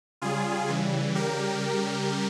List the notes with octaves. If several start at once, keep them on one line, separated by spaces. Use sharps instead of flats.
C#3 G3 F4 G#4
C#3 E3 G3
C#3 G3 G4 A#4